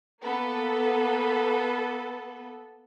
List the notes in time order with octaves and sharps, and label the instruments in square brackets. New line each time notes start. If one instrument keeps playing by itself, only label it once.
[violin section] A#3 B3 A4 B4